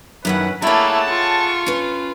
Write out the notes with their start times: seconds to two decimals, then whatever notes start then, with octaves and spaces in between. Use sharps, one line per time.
0.25 F#2 D#3 C#4 E4 B4 F#5
0.62 A3 A#3 E4 G#4 C#5 F#5 G5 A5
1.10 F4 C#6
1.66 C#4 B4